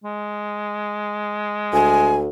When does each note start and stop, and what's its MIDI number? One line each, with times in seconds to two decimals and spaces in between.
0.04 2.20 56
1.73 2.29 38
1.73 2.15 80